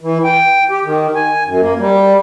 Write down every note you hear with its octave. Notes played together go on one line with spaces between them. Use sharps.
E3
G5
G4
D#3
G#5
F#2
A#3
G3